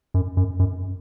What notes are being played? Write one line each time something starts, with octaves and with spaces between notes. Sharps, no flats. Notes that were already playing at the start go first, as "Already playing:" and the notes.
F#2
F#2
F#2